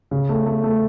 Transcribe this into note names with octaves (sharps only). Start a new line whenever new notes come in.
C#3
A3
A3
A3